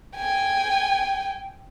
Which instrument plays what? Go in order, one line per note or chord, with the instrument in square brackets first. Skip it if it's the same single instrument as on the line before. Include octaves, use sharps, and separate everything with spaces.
[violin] G5 G#5